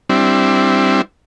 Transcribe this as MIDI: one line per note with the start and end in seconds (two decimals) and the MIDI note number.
0.10 1.02 55
0.10 1.02 60
0.10 1.02 62
0.10 1.02 64